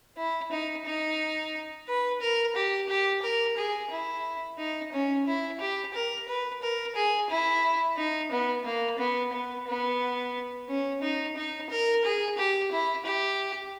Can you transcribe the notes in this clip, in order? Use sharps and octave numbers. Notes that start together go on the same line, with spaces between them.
E4
D#4
D#4
B4
A#4
G4
G4
A#4
G#4
E4
D#4
C#4
E4
G4
A#4
B4
A#4
G#4
E4
D#4
B3
A#3
B3
B3
B3
C#4
D#4
D#4
A#4
G#4
G4
E4
G4